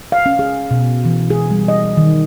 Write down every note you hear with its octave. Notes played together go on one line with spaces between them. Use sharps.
F5
C#4
G#4
B2
E3
G#4
G3
D#5
D#3